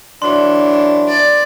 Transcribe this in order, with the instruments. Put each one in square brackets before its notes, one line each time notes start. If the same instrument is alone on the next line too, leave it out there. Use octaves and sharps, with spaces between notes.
[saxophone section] E3 F#3 D4 [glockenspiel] C6
[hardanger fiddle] D5